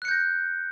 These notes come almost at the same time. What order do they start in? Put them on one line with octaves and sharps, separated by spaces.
F#6 C#7 G6 A#6